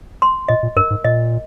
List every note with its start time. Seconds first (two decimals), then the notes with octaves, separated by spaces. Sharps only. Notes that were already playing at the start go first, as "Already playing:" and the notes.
0.22 C6
0.48 A#2 D#5
0.63 A#2
0.76 G2 A#4
0.90 G#2
1.04 A#2 D#5